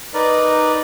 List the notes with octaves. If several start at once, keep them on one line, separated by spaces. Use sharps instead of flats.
D#4 A#4 B4 D5